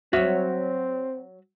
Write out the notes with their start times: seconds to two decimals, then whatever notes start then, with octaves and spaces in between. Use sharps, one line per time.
0.13 F#3 C4 F#4 C#5 E5